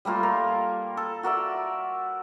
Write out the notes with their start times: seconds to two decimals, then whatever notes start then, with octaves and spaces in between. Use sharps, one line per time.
0.05 G3 A3 A#3 F4
0.23 A#4
0.97 A4
1.23 F#4 A#4 D5 E5